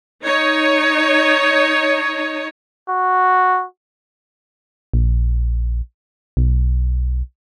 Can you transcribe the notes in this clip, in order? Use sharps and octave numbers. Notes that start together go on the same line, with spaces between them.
D#4 C#5
F#4
A#1
B1